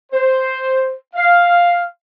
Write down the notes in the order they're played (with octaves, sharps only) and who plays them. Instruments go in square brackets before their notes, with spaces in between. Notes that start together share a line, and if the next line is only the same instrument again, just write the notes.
[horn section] C5
F5